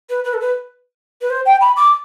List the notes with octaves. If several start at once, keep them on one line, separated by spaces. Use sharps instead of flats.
B4
B4
A4
B4
B4
C5
G5
B5
D6